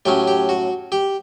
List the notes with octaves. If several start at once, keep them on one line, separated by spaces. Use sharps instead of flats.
A2 F#3 C#4 G4
G4
F#4
G4